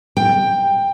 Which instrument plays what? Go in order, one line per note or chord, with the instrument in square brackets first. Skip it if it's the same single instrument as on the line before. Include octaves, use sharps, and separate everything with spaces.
[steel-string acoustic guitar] G5